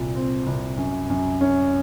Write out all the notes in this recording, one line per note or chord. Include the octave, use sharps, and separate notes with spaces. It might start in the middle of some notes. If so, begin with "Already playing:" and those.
Already playing: C2 A#2
C4
C2
F#2
F#2
C#4